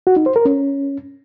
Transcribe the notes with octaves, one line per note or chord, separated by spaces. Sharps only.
F#4
D#4
C5
A#4
C#4